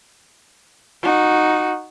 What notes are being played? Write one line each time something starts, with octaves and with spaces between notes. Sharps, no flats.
D#4 F#4